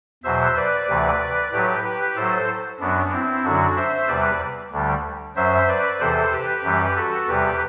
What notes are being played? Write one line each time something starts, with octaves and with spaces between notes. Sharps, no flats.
E2 B2 F#3 C5 E5
B4 D5
D2 C3 E3
A2 F#3 G4 B4
G4 B4
A2 F#3 A4 C5
F#2 F#3 B3 D4
C4 E4
F#2 D3 F#3 D4 F#4
C5 E5
E2 C3 G3 B4 D5
D2 D3 G3
F#2 F#3 C5 E5
B4 D5
E2 C3 E3 A4 C5
G4 B4
F#2 E3 G3
F#4 A4
E2 C3 G3 G4 B4